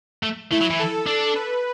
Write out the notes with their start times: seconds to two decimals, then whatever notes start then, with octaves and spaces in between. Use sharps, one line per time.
0.23 A3
0.51 A3 E4
0.61 F#3
0.70 E3
0.79 A4
1.07 D4 A4
1.35 B4